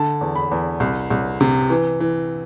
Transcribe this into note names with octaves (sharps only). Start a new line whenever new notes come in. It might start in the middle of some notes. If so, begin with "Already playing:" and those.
Already playing: D3 A5
E2
B5
E2
C2
C2
C3
E3
E3